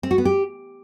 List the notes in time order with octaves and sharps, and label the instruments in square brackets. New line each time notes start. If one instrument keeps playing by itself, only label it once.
[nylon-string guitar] C4
F#4
B3
G4